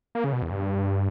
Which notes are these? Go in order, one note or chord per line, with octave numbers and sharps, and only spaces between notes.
A#3
C#3
B2
E2
G2